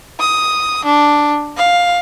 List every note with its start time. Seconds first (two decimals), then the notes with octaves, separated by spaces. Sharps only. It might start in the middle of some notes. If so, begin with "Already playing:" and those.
0.20 D#6
0.85 D4
1.57 F5